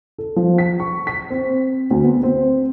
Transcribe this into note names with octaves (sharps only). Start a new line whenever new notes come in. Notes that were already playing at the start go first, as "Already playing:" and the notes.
A4
F3
B6
C#6
B6
C4
D2
B3
C4